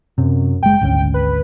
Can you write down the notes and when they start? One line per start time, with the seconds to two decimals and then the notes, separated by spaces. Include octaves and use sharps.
0.18 F#2 C3
0.63 F#1 G#3 G5
0.81 G#1 D2 C#4
1.14 B4